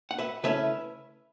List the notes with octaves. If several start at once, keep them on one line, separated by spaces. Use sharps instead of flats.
F#5
B4 E5
C#3 A3 C#4 E4 B4 E5